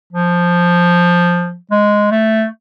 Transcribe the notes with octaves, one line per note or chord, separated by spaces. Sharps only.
F3
G#3
A3